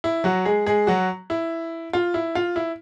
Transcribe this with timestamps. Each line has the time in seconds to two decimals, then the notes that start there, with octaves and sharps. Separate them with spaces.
0.04 E4
0.24 F#3 F#4
0.45 G#3 G#4
0.67 G#3 G#4
0.87 F#3 F#4
1.30 E4
1.93 F4
2.14 E4
2.35 F4
2.56 E4